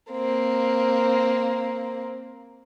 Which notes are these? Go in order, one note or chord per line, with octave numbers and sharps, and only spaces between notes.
A#3 C4